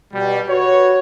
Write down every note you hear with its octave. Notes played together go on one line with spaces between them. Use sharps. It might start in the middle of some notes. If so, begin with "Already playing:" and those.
B2 G3
F#4 B4 C#5